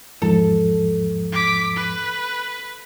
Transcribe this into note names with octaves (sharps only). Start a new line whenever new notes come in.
E2 G#2 F3 A4
D6 B6
B4